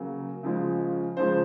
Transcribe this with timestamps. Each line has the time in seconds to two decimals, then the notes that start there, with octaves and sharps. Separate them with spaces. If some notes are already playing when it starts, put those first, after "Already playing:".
Already playing: C#3 F#3 A#3 F#4
0.43 C#3 F3 G#3
1.17 C#3 F3 G#3 C5